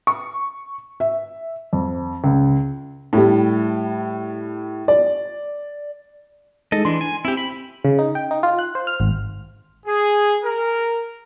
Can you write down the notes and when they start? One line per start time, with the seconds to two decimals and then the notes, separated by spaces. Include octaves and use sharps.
0.07 C#6
1.00 E5
1.73 F2
2.24 C#2
3.13 A2 G3
4.88 D5
6.72 G#3 D#4 G#4 A4 D#5
6.85 E3 D4 C6
7.01 G#5
7.25 C4 E4 G4
7.37 B5
7.84 C#3
7.99 D#4
8.15 G5
8.31 D#4
8.43 F4
8.59 F#6
8.75 C5
8.87 F6
9.00 G#1
9.86 G#4
10.44 A#4